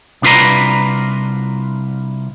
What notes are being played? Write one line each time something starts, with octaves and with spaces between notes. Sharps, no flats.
C2 D4 F4 B4 A#5